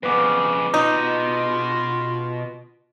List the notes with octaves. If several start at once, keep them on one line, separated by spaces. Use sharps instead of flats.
F2 C#3 B3 B4 D6
B2 D#4 F4 D#5